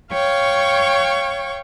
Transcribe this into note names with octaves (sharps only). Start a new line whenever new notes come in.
C#5 F5 G5 C#6